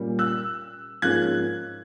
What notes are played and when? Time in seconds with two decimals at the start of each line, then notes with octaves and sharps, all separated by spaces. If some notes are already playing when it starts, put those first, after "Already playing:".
Already playing: A#2 G3 A#3 C#4
0.19 E6 F#6
1.02 G#2 F3 A#3 C#4 F#6 G#6